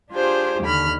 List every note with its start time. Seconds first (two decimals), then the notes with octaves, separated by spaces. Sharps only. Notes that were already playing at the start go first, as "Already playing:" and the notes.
0.12 D4 F4 G4 G#4 C5
0.62 D#2 D3 B5 F6